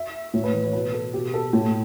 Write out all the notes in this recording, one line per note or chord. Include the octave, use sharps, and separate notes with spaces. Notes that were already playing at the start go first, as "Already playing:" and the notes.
Already playing: E5
A2 C#5
B4
E3
C#5
B2 B4
A4
B2 G4
A4
A2